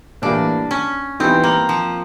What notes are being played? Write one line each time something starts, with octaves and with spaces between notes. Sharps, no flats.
A2 E3 G3 A#3 D4
C#4
E3 G3 B3 C4 D#4
A#3
F3